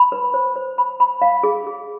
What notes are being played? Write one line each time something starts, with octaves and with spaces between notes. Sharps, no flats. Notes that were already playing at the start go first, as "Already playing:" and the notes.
Already playing: B5
B4
C5
C5
B5
B5
F5
G#4
G#4